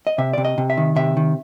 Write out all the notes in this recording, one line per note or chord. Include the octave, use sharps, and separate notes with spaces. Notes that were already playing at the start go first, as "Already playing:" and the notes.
D#5
C3 E5
C3 D5
D#5
C3
E5
D#3
C3 E5
D#3